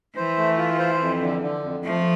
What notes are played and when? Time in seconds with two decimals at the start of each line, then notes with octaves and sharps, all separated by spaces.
0.16 E3 C5
0.37 A3
0.58 F4
0.79 C5
1.00 F2
1.21 D3
1.42 D3
1.63 F2
1.84 F3 A3